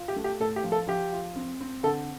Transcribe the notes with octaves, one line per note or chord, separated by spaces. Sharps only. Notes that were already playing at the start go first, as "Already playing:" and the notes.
Already playing: F4
G4
A3
G4
A2 A4
G4
F3
A4
F3 G4
F4
C4
C4
D3 A4